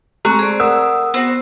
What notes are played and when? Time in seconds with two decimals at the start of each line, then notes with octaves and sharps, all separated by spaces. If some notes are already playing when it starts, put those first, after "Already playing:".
0.25 G#3 A3 C4 A#5 C#6 F#6
0.39 G#4 C5 D5
0.60 A#4 D5 F#5 D#6 E6
1.14 B3 C4 F#4 C5